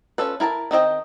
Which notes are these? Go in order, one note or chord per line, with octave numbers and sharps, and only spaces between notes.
C#4 F4 A4 B4
E4 A#4 G#5 A5
D#3 C4 D#5 G5